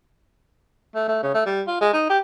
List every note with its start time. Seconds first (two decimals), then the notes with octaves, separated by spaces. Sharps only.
0.95 A3
1.08 A3
1.22 C#3
1.34 A3
1.46 G3
1.67 F4
1.81 G#3
1.93 D#4
2.09 G4